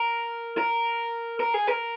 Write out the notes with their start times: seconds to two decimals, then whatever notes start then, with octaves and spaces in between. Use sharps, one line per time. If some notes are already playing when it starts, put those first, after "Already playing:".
Already playing: A#4
0.58 A#4
1.40 A#4
1.54 G#4
1.67 A#4